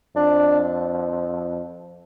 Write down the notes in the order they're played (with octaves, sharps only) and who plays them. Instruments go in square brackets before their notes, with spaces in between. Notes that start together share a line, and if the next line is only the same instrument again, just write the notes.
[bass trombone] F2 [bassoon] D4